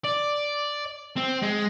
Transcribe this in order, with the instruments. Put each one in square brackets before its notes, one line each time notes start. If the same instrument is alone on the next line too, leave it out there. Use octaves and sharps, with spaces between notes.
[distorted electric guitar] D5
C4
G#3